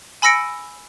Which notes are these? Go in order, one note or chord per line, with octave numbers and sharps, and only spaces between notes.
G#5 B5 E6 A#6 C#7 D7